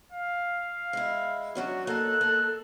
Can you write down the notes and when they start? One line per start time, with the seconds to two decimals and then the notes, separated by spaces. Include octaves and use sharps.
0.12 F5
0.93 G#3 E4
1.55 F#3 C#4 D4 F#4
1.87 A#3 D#4 A4 F#6
2.21 A#3